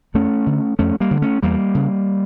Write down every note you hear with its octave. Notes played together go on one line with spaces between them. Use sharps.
F2 A3 C#4
D3
F2 A3 C#4
G3 A#3
D3
A3 C#4
E2 G3 A#3
C#3